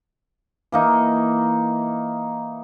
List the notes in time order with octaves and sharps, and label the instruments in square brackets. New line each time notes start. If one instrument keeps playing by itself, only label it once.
[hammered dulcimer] E3 A#3 D#4